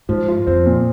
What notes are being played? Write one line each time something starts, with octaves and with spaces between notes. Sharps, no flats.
G#2 F3
F4
F2 C4
A#2